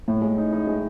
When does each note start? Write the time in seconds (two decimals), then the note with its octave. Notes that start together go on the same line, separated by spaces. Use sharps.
0.08 A2
0.22 G#3
0.38 D#4
0.53 D#4
0.67 G#3